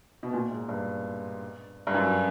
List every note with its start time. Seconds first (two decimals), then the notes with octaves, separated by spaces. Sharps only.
0.23 B2
0.33 A#2
0.51 G#2
0.69 G2
1.87 G2
1.94 F#2